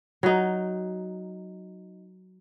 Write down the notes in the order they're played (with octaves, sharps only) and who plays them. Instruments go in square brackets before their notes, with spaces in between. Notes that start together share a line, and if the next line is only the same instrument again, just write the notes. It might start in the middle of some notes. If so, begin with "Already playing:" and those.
[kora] F#3 D#4